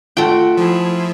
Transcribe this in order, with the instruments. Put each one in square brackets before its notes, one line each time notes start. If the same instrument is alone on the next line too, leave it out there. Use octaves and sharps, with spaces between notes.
[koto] A3 G5 [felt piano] F4 [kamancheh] F#4
[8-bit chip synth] F3 [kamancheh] E4 G#4